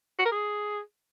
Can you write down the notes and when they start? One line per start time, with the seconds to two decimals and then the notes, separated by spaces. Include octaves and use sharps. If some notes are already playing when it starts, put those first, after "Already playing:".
0.19 F#4
0.25 A#4
0.32 G#4